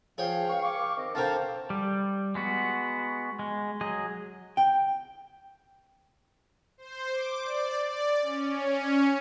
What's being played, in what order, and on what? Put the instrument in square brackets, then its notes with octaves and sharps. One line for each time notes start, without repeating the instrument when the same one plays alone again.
[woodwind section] F3 [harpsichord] G#4 C#5 G5 [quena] F5
[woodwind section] C#2 C#6
[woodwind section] F5 C#6 [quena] D6
[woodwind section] D#3 C4 A#4
[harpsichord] D3 C4 A#4 [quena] C5 [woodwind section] F5 A5
[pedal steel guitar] G3
G#3 B3 F#4
G#3
F#3 G#4 D#5
[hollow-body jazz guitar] G5
[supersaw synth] C5
D6
D5
D5
C#4